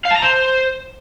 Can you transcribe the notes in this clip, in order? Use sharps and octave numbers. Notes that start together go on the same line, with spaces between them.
F5
A5
A#5
C5